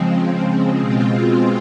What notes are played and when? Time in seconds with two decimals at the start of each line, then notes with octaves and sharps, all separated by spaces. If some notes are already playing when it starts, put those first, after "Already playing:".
Already playing: C#3 F3 G#3 C4
0.78 B2 G#3 C4 F4